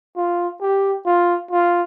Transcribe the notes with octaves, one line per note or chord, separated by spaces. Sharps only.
F4
G4
F4
F4